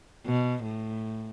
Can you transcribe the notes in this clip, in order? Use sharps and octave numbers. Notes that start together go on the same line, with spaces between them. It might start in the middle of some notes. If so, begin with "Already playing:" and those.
B2
A2